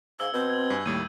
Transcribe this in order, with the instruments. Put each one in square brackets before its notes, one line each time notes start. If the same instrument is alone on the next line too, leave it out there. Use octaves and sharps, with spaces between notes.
[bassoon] G#2 [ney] F5 [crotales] E6 G#6 G7
[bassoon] B2 [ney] C4 [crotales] G6 G#6
[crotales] G#6 F#7
[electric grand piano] G2 G#5 [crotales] G7
[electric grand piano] D#2 A2 G3 [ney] A#3 [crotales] G#6 D#7